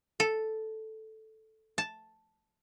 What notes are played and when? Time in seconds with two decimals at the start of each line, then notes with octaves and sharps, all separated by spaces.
0.20 A4
1.78 A5